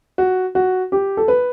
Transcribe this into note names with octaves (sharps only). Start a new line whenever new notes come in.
F#4
F#4
G4
A4
B4